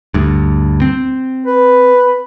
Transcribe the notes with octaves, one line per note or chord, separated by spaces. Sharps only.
D2 G2
C4
B4